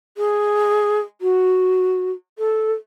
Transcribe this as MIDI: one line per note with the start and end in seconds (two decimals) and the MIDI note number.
0.17 1.00 68
1.21 2.10 66
2.38 2.72 69